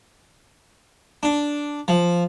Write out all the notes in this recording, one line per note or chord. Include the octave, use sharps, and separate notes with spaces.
D4
F3